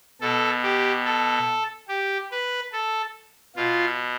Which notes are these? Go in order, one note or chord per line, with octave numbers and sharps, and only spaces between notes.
B2 A4
G4
A4
G4
B4
A4
B2 F4